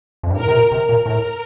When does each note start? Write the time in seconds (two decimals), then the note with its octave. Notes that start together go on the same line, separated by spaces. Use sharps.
0.23 F2
0.30 G2
0.38 A2 A#4
0.48 C3
0.55 A#2
0.72 C3 A#4
0.89 A#2
1.06 A2